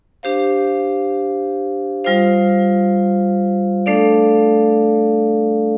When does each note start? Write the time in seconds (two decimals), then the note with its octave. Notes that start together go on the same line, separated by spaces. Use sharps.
0.23 D4 G4 C5 F5
2.04 G3 F4 C5 F5
3.86 A3 D4 A4 D5 F5